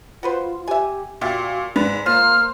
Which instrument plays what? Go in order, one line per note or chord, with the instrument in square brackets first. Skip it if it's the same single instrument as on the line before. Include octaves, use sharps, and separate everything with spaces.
[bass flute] F4 [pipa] F#4 B4 C5
[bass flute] G4 [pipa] E5 G#5
[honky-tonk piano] A#2 [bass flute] F#4 [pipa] G4 D5 E5
[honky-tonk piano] G#2 [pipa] B4 [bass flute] D5
[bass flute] A#3 [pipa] F4 [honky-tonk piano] C5 [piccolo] F6